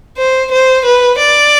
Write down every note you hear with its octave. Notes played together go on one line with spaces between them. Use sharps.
C5
C5
B4
D5